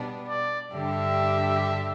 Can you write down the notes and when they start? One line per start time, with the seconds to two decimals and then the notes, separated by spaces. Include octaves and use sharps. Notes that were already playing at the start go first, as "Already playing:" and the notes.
Already playing: B2 G3 B3 D4
0.29 D5
0.72 G2 D3 G3 D4 G4 E5